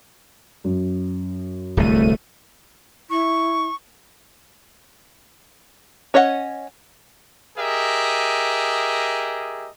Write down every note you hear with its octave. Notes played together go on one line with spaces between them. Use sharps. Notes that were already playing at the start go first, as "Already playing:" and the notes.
F#2
D1 C2 A3 D#7
E4 C#6
C#4 C#5 D#5 E5 F#5
G4 G#4 A#4 D#5 E5